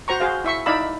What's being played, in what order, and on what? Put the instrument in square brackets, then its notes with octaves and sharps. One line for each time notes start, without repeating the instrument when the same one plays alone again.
[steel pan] F#4 C5 A#5 C#6
F#4 G#4 C5 F5
E4 E5 C#6
D#4 E4 D5 F5 B5 E6